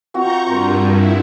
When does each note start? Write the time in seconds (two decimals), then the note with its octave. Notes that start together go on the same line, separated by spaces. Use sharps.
0.14 C4 F4 F#4 A#5 C#6 G6
0.47 G2 C4 A#4
0.88 E4